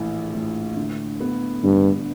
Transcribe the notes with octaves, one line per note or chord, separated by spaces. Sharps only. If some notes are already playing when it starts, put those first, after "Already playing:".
Already playing: A#1 A2 E3
A2
D3
B3
G2 D3